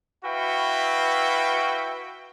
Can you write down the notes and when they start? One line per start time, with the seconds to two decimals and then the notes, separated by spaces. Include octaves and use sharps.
0.24 E4 F#4 B4 E5 F5 G5